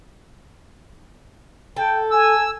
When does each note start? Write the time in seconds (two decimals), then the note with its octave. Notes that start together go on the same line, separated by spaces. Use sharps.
1.76 A4 G5
2.11 G#5 E6